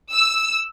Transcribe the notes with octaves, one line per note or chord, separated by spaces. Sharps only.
E6